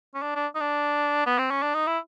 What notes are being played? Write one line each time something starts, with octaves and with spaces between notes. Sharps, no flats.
C#4
D4
D4
D#4
D4
B3
C4
C#4
D4
D#4
E4